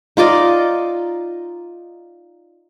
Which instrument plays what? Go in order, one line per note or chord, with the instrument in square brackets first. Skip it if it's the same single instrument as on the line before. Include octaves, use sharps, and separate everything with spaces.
[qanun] D#4 F4 D5 D#5